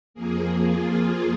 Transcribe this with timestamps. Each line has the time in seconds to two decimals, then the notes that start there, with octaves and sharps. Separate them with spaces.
0.14 F2 F3 A#3 G#4
0.68 F4